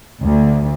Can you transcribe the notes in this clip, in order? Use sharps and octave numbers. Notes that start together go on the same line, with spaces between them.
D2